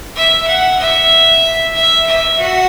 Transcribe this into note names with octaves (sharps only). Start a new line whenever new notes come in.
E5
F#5
E5
E5
E5
F#4